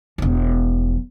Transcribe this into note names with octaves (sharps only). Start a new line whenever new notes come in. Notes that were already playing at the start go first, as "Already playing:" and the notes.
E1 F3